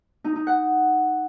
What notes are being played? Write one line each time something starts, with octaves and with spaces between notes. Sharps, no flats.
D#4
D#4
F#5